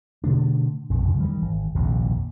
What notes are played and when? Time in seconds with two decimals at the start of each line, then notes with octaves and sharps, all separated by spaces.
0.24 B2 D3 A3 D4
0.90 A#1 F2
1.02 C#2 F#2 C3
1.19 D#3 E3 G3 A#3
1.42 G#1
1.75 D#1 A#1 F2 C3